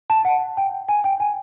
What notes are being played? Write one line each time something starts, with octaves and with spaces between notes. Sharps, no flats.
A5
F#5
G5
G#5
G5
G#5